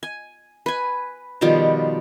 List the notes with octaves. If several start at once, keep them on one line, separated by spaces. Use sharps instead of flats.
G#5
B4 G#5
B2 D#3 F3 G3